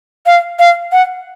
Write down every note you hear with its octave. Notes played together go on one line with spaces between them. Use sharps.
F5
F5
F#5